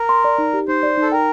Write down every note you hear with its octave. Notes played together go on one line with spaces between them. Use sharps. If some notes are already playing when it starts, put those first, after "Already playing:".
Already playing: A#4
C6
D5
D#4
G4
D#4 C5
D5
D#4 A4
A#4 G5